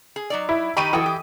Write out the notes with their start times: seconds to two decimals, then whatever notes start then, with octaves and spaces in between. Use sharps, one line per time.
0.16 G#4
0.30 F#3 D#4 D5
0.49 E4
0.77 D#3 D#4 G4 B5 C#6 D#7
0.93 E3 F#4 A4 G5 D#6
1.06 G4